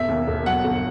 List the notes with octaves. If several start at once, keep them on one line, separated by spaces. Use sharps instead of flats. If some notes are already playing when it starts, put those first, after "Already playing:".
Already playing: E1 E5
D#2
E1
F#3 F#5
G1